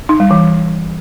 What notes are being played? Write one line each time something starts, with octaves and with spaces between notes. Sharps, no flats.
D#4
G3
E3